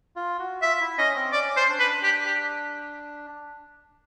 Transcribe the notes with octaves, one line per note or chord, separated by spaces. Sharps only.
F4
F#4
F4 E5
E4
C#4 D#5
C4
C#4 D5
C5
D4
B4
G4
G4